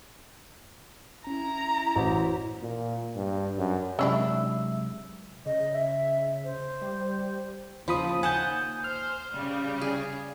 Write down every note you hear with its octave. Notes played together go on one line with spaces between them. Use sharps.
C#4 E4 A#5
A1 F#4 C5
A#2
G2
F#2
C3 F#3 G#3 C#4 D4 E4 E5 E6
C#3 D#5
E5
C5
G3
D#2 C#3 F3 C5 B5 D#6
D#2 F#5 G#5 A5 D#6 G6
C5 F6
C#3 G3
G#4